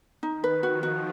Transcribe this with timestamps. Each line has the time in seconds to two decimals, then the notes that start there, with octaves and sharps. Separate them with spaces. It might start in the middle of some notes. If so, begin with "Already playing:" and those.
0.23 D#3 D#4
0.44 B4
0.62 F3 F#4
0.83 F#4